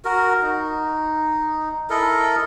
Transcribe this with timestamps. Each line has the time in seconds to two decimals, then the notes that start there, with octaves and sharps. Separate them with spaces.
0.05 F#4 A#4
0.42 D#4
1.90 E4 A4 A#4 D#5